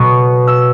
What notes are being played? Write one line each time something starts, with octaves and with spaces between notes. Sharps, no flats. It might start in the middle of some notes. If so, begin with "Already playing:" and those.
Already playing: B2 F#3 B3 C#6
E6